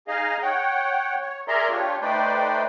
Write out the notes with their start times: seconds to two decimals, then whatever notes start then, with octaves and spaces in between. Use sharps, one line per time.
0.08 D#4 G#4 D#5 F5
0.42 C#5 F#5 G5
1.21 C#5
1.48 G#4 A#4 D5 E5 A#5 C6
1.70 D4 F4 G4 C#5
2.01 A3 D#4 B4 C5 D5 G5